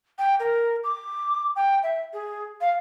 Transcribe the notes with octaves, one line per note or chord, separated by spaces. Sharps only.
G5
A#4
D6
G5
E5
G#4
F5